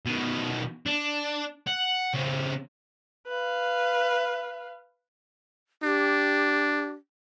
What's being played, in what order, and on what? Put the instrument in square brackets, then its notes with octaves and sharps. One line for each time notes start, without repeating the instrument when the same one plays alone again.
[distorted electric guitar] B2 D#3
D4
F#5
C#3 C4
[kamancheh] B4 F5
[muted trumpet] D4 [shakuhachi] G4